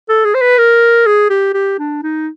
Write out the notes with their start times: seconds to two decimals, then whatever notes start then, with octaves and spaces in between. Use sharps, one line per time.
0.09 A4
0.25 G#4
0.35 C5
0.42 B4
0.58 A#4
1.06 G#4
1.30 G4
1.54 G4
1.79 D4
2.03 D#4